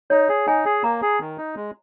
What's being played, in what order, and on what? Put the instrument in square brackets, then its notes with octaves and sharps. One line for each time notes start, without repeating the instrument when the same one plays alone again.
[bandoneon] D#4 [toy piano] C#5
[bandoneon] G#4
[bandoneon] D#4 [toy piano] G#5
[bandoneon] G#4
[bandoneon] A#3 [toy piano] A#5
[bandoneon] G#4
D#3
D#4
G#3